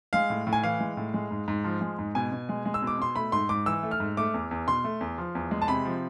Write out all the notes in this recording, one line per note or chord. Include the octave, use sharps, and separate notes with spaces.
G#3 F5
A2
A2
G#5
E3 F5
G#3
A2
G#3
G#2
G#2
F3
G#3
G#2
B2 G#5
B2
G#3
G#3
E6
B2
D6
B2 C6
A3 B5
G#2 C6
G#2 D6
E3 E6
A3
F6
G#2
A3 D6
E2
E2
B2 C6
A3
E2
F3
E2
G#3
A5
C3 B5
F3